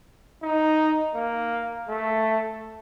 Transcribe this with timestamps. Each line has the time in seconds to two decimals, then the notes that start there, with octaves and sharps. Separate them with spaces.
0.43 D#4
1.15 A#3
1.89 A3